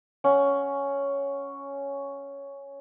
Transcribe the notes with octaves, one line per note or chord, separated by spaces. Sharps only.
C#4 F#5